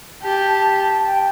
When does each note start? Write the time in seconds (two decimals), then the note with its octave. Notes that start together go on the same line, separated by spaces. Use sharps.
0.23 G4 A5
1.06 G5